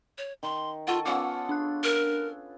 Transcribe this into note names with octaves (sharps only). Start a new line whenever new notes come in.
C#5
D#3 C6
F4 A4 F#5 C#6
B3 C#4 F4 F#5 D6
D4 F#6
A#4